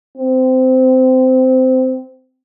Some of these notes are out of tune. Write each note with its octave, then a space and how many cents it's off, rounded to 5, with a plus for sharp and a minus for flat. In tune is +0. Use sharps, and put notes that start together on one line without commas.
C4 -15